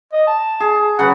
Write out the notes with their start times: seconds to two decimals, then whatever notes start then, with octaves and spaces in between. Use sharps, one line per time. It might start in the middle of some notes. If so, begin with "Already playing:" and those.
0.13 D#5
0.27 A5
0.60 G#4
0.99 C#3 F#3 B4 F#5